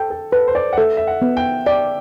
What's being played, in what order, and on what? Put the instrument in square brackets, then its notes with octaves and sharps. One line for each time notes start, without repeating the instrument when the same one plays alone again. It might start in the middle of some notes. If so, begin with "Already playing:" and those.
Already playing: [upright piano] A4 [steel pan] G5
[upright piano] A4
[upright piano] A4 [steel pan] B4
[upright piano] C5
D5
F#5
[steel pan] A4 [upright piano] E5
[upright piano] E5
F#5
[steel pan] B3
[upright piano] G5
[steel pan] D5 [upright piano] G5